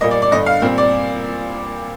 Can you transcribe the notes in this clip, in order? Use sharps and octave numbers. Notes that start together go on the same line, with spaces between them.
A#2 G3 A#3 D#5
D5
D5
G2 D3 G3 D#5
F5
A#2 G3 C4
D5